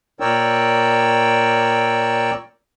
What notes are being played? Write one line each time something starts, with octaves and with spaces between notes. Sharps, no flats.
A#2 A#4 C#5 D5 G5 E6